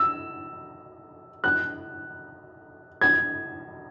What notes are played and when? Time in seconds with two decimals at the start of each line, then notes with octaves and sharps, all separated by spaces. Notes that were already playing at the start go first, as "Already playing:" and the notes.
Already playing: E6
1.44 F#6
3.01 G#6